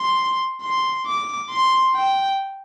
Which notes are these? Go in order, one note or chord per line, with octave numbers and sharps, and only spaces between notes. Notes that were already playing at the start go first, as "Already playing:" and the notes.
Already playing: C6
C6
D6
C6
G5